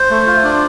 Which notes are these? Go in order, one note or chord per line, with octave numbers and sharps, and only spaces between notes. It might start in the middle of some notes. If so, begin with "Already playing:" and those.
Already playing: C5
A3
F4
D4